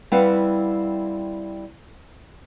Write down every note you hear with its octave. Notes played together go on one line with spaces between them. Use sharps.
G3 C4 E4 B4 F5 F#5